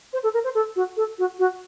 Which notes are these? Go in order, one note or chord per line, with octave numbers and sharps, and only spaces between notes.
C5
A4
A#4
C5
A4
F#4
A4
F#4
F#4